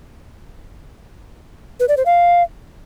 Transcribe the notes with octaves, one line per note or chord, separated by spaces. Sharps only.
B4
D5
C5
F5